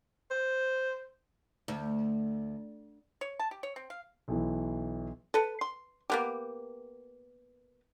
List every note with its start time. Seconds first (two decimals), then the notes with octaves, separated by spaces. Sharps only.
0.31 C5
1.68 D2
3.21 C#5
3.39 A5
3.51 G4
3.63 C#5
3.76 C4
3.90 F5
4.28 B1 E3
5.34 A4 B4
5.61 C6
6.10 A#3 B3 G4